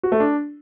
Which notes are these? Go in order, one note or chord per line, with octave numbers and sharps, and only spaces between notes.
F#4
A3
D4